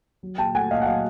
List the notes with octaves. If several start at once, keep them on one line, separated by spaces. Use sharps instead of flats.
F#3
A#2 G5 A5
A3 F#5 G#5
A#2 D#5 F5
F#5
F#3 D#5 F5